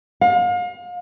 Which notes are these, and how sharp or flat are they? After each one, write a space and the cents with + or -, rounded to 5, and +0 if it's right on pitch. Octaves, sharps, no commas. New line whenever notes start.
F5 +35